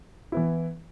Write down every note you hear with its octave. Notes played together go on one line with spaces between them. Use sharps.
E3 B3 E4